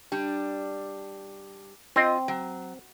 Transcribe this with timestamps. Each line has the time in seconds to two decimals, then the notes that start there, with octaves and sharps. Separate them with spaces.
0.12 G3 D4
1.96 C4 F4 D#5
2.28 F#3